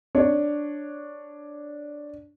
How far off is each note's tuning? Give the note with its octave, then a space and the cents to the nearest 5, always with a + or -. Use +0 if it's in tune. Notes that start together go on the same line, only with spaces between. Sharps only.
D4 +0 C#5 +0